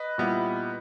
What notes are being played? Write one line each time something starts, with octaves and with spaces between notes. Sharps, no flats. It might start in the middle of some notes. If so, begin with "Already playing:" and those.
Already playing: B4 D#5
A#2 G3 B3 E4